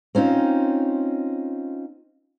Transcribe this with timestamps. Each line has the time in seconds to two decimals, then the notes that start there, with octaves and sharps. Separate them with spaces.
0.15 C4 C#4 D#4 F4